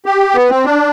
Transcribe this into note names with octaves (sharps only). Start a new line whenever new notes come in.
G4
B3
C4
D4